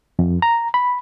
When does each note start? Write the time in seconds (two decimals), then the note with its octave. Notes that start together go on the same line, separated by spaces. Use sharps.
0.19 F2
0.42 A#5
0.74 B5